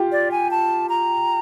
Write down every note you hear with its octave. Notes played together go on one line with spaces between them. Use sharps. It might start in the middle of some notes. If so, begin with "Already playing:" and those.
Already playing: F4 G4
D5
G#5
A5
A#5